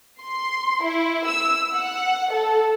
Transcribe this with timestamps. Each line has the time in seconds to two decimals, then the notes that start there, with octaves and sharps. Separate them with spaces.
0.22 C6
0.83 E4
1.26 E6
1.74 F#5
2.31 A4